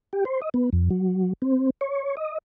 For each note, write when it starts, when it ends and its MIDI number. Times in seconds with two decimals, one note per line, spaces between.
0.13 0.24 67
0.25 0.40 72
0.42 0.49 75
0.54 0.70 59
0.73 0.89 41
0.90 1.33 54
1.42 1.70 60
1.81 2.15 73
2.17 2.38 75